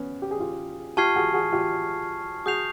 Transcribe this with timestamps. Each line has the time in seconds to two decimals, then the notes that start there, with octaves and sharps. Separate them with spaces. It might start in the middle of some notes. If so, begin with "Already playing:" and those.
Already playing: B3 C#4
0.22 G4
0.31 G#4
0.40 F4 G4
0.97 F4 G4 A5 C#6 F6 G#6 C7
1.16 F#4 G#4
1.34 F#4 G#4
1.53 F4 G4
2.46 F#4 G#4 D#6 G6 C7 F7